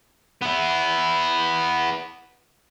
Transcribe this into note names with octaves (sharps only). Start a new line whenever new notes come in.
B3 E4